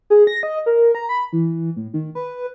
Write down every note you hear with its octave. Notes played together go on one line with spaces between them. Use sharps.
G#4
A#6
D#5
A#4
A#5
B5
E3
A2
D#3
B4